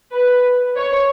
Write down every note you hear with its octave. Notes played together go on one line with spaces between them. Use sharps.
B4
C#5